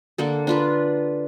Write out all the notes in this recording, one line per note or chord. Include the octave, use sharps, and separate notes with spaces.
D3 A#3 A4
D4 F4 B4